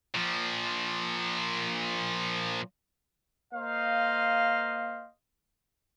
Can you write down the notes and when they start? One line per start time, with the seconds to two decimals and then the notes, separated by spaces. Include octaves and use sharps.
0.14 A#2 F3
3.54 A#3 C5 D#5 F5